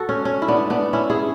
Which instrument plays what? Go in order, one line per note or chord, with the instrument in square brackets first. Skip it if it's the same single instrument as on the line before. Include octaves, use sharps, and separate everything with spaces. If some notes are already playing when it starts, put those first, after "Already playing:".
Already playing: [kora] F#4 A4
C#4
C#4
E4
B3 D4
B3 D4
C#4 E4
E4 G#4